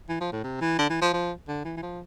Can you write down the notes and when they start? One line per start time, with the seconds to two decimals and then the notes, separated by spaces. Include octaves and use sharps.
0.09 E3
0.21 F3
0.33 A2
0.44 C3
0.61 E3
0.79 D3
0.90 E3
1.02 F3
1.13 F3
1.48 D3
1.65 E3
1.77 E3
1.83 F3